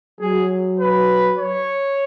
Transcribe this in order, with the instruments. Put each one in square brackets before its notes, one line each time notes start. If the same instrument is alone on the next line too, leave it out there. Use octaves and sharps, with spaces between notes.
[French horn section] F#3 [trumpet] G#4
[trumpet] B4
C#5